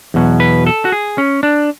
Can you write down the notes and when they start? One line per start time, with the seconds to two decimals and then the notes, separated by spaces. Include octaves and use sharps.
0.14 E2 B2 F#3
0.40 B4
0.66 A4
0.85 F#4
0.92 G#4
1.18 C#4
1.43 D4